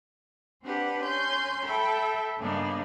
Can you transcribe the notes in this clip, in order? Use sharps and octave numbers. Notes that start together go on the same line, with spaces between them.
C4 D4 G4 B4 F#5
C#4 C6 G6
A4 E5 G5 B5
G2 C#3 A#3 B3 D4 D#4